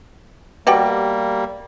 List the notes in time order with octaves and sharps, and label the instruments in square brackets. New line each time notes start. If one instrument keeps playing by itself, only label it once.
[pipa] B2 F#4 G4 [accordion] G3 A#3